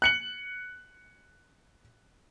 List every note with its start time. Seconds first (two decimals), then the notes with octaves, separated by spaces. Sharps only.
0.02 F#6 C#7 F#7